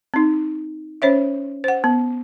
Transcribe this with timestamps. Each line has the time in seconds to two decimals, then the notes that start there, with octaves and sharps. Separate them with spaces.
0.14 C4 D#4
1.02 C#4 C5 C#5 E5
1.64 C5 F#5
1.84 B3